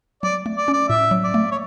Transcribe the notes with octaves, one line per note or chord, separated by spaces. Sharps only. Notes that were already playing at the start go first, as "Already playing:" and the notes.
F#3 D5
A3
D5
C#4
D5
A2 E5
F#3
D5
A3
C#5